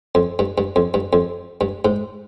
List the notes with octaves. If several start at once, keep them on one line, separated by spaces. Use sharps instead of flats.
F2
G2
G2
F2
G2
F2
G2
G#2